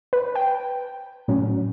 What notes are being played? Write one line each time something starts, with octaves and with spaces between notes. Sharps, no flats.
B4
G5
A2 F#3 C#4